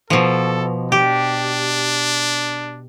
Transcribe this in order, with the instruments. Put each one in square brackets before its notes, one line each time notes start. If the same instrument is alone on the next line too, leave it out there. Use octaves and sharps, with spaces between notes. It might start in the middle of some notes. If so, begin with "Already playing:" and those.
[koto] B2 F3 [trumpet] A4
[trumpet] D4 [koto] G4